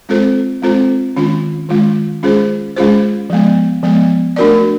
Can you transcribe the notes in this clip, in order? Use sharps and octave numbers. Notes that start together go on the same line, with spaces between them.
G#3 C4 F4 A4 C5
G#3 C4 F4 A4 C5
D#3 G#3 C#4 F4
D#3 G#3 C#4 F4
G#3 C#4 F4 G#4 C5
G#3 C#4 F4 G#4 C5
F3 G#3 B3
F3 G#3 B3
A3 D4 F#4 A#4 D5